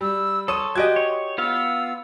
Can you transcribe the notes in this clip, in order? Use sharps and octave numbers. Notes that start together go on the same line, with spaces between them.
G3 E6
A4 C#5 C6 D#6 D#7
F#4 G4 D#5 G#5 F#6 G#6
C#5
B3 F4 F5 E6